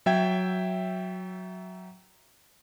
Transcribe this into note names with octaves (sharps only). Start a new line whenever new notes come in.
F#3 E5 G5 G#6